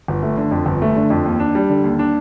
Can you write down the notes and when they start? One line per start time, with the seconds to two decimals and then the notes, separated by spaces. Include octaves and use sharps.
0.08 G1
0.23 A3
0.37 D3
0.51 F2
0.66 G1
0.82 A3
0.96 D3
1.10 F2
1.25 D#2
1.40 D4
1.55 G3
1.70 D3
1.84 D#2
1.99 D4